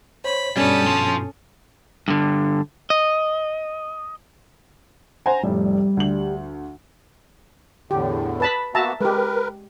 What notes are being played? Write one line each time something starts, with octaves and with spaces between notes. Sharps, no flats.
C5 C#5 B5
G2 B2 G3 C#4 A4 D#6
F4 A5
G2 D3
D#5
C5 F#5 G#5 A#5
F1 A2 G3
D2 F#7
E2 A2 D3 G4
B4 A5 B5
A#3 B3 F#4 E5 A5 A#5
G#3 G4 A#4 B4